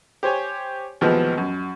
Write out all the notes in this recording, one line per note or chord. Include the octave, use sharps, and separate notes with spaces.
G4 C5 C#5 G#5
D#2 B2 E3 F3 G#3 B3
F#2